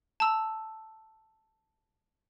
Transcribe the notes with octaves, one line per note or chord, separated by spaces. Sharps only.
A5 A#5 E6